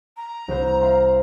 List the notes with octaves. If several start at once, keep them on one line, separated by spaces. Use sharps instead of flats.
A#5
C2 B4 C5
E5 F5 C6